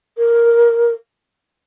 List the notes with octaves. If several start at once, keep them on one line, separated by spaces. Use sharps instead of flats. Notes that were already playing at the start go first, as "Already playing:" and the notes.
A#4